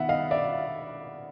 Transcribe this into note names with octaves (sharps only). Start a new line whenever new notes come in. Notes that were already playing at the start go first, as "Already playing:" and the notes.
Already playing: D#3 B3 E5 F#5
D#5 F5
D5 E5